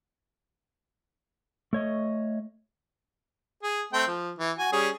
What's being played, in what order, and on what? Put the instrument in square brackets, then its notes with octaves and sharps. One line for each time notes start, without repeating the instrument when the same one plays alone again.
[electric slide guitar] A3 C#5 D#5
[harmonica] G#4
A3 C4 G5
F3
E3
F#4 G#5
G3 C#4 G#4